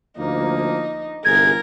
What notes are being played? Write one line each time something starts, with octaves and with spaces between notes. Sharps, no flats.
D2 F3 A#3 D#4
G1 C2 G#4 A#4 G#6